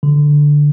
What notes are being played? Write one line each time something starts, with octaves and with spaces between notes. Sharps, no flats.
D3